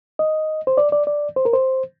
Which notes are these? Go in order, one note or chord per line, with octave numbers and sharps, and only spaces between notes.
D#5
C5
D5
D5
D5
C5
A#4
C5